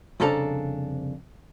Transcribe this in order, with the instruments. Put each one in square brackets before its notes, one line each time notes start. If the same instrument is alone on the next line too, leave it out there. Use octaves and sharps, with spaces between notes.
[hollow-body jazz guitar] C2 F2 C#3 D4 A4 A#5